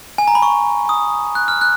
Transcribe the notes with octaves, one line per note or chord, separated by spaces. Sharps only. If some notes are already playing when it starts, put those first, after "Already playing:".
G#5
A#5
B5
C#6
D#6
F#6
F6
F#6